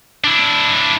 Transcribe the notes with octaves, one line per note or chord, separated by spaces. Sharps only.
D4 E4